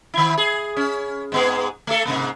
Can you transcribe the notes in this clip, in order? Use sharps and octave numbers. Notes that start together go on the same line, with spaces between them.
D#3 E4
G#4
C#4
G#2 B3 G#4
A3 A4
G#2 C3 A#3